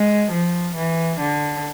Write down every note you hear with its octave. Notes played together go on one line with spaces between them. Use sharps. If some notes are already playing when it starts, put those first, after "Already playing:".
Already playing: G#3
F3
E3
D3